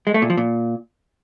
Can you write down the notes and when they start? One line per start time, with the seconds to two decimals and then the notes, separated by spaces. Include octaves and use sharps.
0.07 G#3
0.14 A3
0.22 A#2
0.30 F3
0.37 A#2